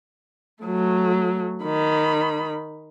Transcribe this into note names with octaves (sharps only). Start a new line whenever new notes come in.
F#3 A3
D#3 B5